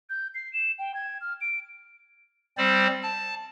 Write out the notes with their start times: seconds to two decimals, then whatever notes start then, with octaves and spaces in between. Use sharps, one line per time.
0.09 G6
0.34 C7
0.53 E7
0.78 G5
0.94 G#6
1.21 F6
1.41 D7
2.58 G3 C4 C5 D5
3.03 A5